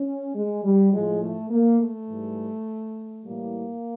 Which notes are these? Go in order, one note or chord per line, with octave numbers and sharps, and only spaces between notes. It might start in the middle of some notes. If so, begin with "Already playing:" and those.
Already playing: C#4
G#3
G3
A2 F3 G#3
A3
A#3
A3
G#2 E3 G3
A2 E3 G3 A#3